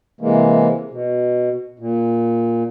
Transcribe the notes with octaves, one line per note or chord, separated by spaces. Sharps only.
C3 E3 G#3 A#3
B2
A#2